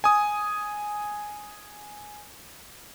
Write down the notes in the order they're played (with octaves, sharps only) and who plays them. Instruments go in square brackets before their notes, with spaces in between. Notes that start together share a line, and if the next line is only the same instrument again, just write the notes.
[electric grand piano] G#5 D#6